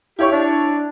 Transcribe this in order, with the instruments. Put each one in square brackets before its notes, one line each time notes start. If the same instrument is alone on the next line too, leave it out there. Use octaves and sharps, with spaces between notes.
[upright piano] E4 C#5 C#6 [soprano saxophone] G4
[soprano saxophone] D4